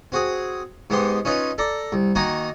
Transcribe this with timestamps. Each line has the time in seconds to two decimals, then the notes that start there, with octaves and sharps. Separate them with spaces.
0.12 C4 F#4 G#4
0.90 G#2 G#3 B3 G4 G5 C6
1.25 C#4 D#4 F4 B4 C#5
1.58 A4 D5 A#5
1.92 C2
2.15 D#3 A#3 D#4 F#4 G#5 A#5